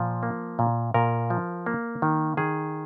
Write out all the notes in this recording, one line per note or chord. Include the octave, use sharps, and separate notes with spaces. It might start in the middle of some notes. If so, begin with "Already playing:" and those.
Already playing: A#2 F3
A#3
A#2
A#2 A#4
F3
A#3
D#3
D#3 G#4